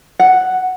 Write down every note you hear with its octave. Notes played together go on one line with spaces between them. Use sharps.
F#5